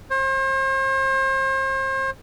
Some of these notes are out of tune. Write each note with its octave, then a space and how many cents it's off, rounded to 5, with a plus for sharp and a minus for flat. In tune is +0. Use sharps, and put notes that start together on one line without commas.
C5 +40